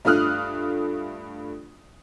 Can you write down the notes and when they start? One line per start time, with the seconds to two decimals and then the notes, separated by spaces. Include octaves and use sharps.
0.05 G2 A3 F4 D#6 F6 F#6